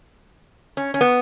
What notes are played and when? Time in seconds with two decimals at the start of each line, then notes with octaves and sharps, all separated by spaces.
0.77 C#4
0.94 C#4
1.01 B3